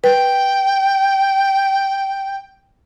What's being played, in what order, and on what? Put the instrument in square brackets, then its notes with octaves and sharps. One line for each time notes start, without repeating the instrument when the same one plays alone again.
[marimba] B4 [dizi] G5